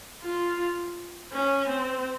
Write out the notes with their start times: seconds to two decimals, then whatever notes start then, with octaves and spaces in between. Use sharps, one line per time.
0.23 F4
1.33 C#4
1.70 C4